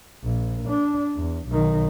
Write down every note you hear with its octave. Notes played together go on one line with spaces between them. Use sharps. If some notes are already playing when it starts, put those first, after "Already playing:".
A#1
D4
E2
B1 D#3